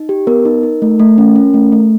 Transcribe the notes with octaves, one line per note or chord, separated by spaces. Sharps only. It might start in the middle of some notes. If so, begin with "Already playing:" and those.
Already playing: D#4
G4
B3 A#4
D#4
D#4
A3
A3
C#4
C#4
A3
A3